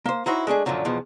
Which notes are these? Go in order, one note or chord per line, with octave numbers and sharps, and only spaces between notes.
A#3 C5
D#4 E4 F#4 C5 C#5
G#3 A3 D4 G#4
F#2 A#2 D3 F3 F#3
E2 B2 F3